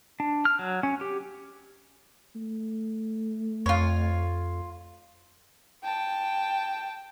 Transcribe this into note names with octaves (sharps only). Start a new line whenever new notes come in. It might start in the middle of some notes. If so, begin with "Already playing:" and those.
D4
F6
F#3
C#4
G4
A3
F2 F4 C#5
G5 A5